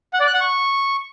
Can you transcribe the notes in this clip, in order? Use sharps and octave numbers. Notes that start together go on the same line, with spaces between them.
F#5
D5
F#6
F#5
C#6